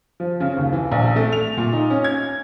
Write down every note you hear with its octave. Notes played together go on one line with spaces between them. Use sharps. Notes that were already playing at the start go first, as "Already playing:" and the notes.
F3
C#3
D#2
E3
A#1
A3
F7
A#2
D#4
C#4
G#6